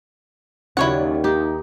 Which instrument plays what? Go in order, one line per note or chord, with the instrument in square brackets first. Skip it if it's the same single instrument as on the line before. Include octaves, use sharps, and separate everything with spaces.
[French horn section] D#2 [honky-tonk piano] C#3 F#3 D5 [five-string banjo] E4 C#5 F#5
[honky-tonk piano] D#4 [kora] G4